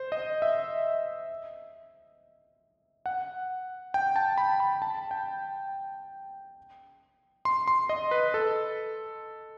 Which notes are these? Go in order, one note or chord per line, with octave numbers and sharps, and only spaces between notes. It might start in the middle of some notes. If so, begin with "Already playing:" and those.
Already playing: C5
D#5
E5
F#5
G5
A5
B5
B5
A5
G5
C6
C6
D#5
B4
A4